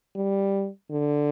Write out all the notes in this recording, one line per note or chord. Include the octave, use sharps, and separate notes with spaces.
G3
D3